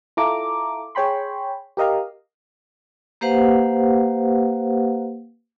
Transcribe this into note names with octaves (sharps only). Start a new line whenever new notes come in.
E4 F4 A4 A#5 D6
G#4 C#5 G5 B5 C6
G4 A#4 D#5 F5 A#5
A#3 G4 B4 C5 F5 F#5